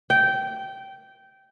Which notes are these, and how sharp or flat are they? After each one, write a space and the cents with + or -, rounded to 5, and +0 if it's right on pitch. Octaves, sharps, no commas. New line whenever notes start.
G5 -15